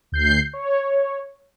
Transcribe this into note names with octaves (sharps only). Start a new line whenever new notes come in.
D2 G6 C7
C#5